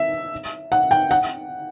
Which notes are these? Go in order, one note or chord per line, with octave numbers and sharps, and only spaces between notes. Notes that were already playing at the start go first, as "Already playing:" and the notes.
Already playing: E5
F#5
G5
F#5